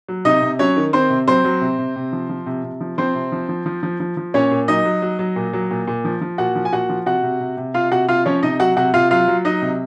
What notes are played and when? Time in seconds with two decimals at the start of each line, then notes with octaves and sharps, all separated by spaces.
0.09 F#3
0.25 C3 D#4 D#5
0.42 C3
0.59 F#3 C#4 C#5
0.76 D#3
0.93 D#3 C4 C5
1.10 C3
1.27 F#3 C4 C5
1.45 F#3
1.61 C3
1.78 C3
1.96 C3
2.13 F3
2.29 F3
2.46 C3
2.64 C3
2.81 F3
2.98 F3 C4 C5
3.15 C3
3.32 F3
3.49 F3
3.66 F3
3.83 F3
4.00 F3
4.17 F3
4.34 A#2 C#4 C#5
4.51 A#2
4.68 F#3 D#4 D#5
4.85 F#3
5.02 F#3
5.19 F#3
5.36 A#2
5.53 F#3
5.71 A#2
5.87 A#2
6.05 F3
6.21 F3
6.38 A#2 F#4 F#5
6.56 F3
6.65 G#5
6.72 A#2 F#4 F#5
6.89 F3
7.06 C3 F#4 F#5
7.23 C3
7.40 C3
7.57 C3
7.74 C3 F4 F5
7.92 C3 F#4 F#5
8.09 C3 F4 F5
8.26 F3 C#4 C#5
8.43 C3 D#4 D#5
8.60 F#3 F#4 F#5
8.76 C3 F#4 F#5
8.94 C3 F4 F5
9.11 F#3 F4 F5
9.28 F#3
9.45 F#3 D#4 D#5
9.62 C3